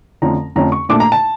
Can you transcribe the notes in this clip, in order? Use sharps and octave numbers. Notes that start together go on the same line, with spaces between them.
F2 D3 F3 A3 C#4 A#5
F2 D3 F3 A3 C#4 A#5
C#6
A#2 A3 D4 D6
A#5
A5